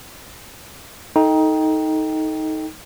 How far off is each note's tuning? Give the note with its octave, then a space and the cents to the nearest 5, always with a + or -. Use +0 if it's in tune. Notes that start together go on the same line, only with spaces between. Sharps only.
D#4 +15 A4 +0 G5 +0